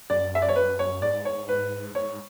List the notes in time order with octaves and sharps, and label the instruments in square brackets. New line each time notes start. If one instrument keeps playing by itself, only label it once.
[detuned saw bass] F#2 [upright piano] D5
[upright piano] E5
D5
C#5
B4
C#5
[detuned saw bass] G#2 [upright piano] D5
[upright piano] C#5
B4
[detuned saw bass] G#2 [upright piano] C#5